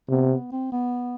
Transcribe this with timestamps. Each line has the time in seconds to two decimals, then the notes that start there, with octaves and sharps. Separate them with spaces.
0.09 C3 B3
0.30 B3
0.52 C4
0.72 B3